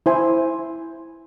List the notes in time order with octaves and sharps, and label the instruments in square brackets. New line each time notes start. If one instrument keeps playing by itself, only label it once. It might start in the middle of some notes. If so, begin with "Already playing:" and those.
[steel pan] E4 C5 G#5